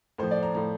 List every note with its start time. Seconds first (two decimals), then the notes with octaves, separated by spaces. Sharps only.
0.18 A2 F3 C5
0.31 D5
0.43 A#5
0.55 A2 F3 A#5